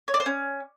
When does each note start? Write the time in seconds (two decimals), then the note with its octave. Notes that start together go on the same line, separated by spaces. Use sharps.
0.08 C#5
0.14 D5
0.20 C5
0.26 C#4